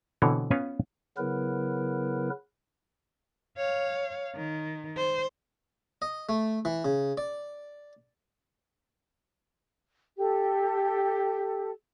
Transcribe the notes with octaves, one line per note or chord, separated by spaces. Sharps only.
B2 D3 E3 C4 C#5 G5
B3 C#4 F4 B4 F5 G#5
C#3 F#3 B3 E4 A#4 B4
C#5 F5
D#3
C5
D#5
A3
E3
C#3
D5
G4 A4